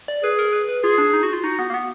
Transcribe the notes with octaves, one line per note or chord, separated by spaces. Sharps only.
D5
G#4 B4
A#4
B4
B4
F4 G#4
D4
D#4
F#4
F4
D#4 F#4
B3
A#3
B3